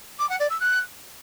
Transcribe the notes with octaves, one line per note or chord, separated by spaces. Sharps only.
D6
F#5
D5
E6
F#6